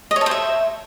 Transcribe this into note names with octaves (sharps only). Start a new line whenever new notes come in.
D#5
C#5
A4
C5
E5